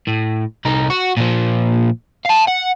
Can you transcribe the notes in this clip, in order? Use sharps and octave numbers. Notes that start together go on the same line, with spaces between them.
A2
C2 D#4
F#4
A#2 F3
F5 A5
F#5